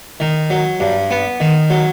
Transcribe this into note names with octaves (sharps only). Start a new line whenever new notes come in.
D#3
F#3
G2
B3
D#3
F#3